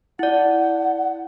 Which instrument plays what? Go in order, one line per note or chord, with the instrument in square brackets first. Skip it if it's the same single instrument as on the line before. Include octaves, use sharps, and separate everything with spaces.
[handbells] E4 D5 [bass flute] F#5